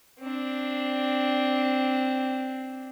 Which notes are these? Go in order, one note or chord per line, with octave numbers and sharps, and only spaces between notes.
C4 D4